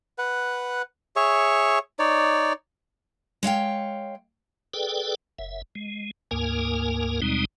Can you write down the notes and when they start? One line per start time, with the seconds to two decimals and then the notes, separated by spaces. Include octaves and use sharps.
0.18 B4 F#5
1.16 G#4 C#5 E5 C#6
1.99 D#4 C#5 D5
3.43 G#3 C#5 F5 G5
4.74 G#4 A4 B4 D5 G5
5.39 F#1 E5
5.75 G#3
6.31 D2 G#2 A#3 A#4 G#5
7.22 D#2 B2 G3 G#3 C4 D#4